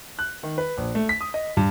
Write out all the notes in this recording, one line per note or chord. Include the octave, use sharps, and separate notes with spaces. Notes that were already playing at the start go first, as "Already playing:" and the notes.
F#6
D#3
B4
A#1
A3
B6
D#6
D#5
G2